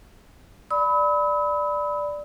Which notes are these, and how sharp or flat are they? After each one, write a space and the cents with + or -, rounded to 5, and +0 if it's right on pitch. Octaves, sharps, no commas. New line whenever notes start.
D5 +0 B5 +10 E6 -45